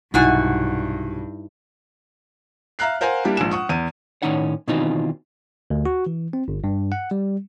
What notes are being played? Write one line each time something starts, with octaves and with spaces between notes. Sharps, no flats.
B1 G2 C3 D#4 E4 F#4 G#5
E5 F5 A#5 F6 F#6 C7
A#4 C5 F5 F#5 G#5
G3 A#3 D4 E4 G4
A#1 G#2 G#5 E7
F#5 C#6 D#6
E2 D#7
A2 D#3 G#3 C#4 D#4 F#5
B2 D#3 E3 C4 D#4 F4
D2
F#4
E3
C4
G1
G2
F#5
G3